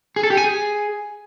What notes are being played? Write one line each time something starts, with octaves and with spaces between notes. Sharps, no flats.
G#4
A4
G4
G#5
G#4